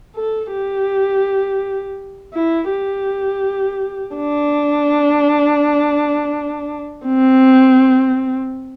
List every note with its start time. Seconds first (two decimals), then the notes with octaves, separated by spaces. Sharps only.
0.16 A4
0.52 G4
2.33 E4
2.70 G4
4.16 D4
7.05 C4